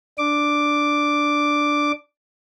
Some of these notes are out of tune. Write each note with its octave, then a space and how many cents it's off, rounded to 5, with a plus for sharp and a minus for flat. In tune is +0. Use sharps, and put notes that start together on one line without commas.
D4 +0 D6 +0